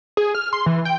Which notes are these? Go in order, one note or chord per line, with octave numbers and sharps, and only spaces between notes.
G#4
F6
C6
E3
G5